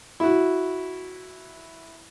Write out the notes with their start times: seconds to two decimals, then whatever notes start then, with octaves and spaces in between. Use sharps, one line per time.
0.20 E4 F#4